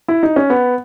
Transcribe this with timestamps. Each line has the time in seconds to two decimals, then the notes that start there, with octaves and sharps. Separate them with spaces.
0.08 E4
0.23 D#4
0.36 C#4
0.50 B3